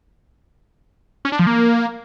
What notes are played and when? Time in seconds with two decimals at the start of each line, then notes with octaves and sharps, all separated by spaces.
1.25 C#4
1.32 D4
1.39 F3
1.47 A#3